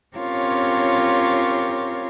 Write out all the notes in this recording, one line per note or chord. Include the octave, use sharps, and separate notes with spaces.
C4 C#4 F4 G4 A#4 C#5